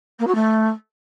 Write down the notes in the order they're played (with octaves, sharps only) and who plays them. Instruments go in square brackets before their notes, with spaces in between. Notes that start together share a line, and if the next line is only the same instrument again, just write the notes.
[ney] A#3
F#4
A3